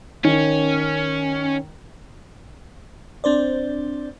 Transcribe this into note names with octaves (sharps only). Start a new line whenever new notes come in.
D#3 C#4
C4 D4 C5 D5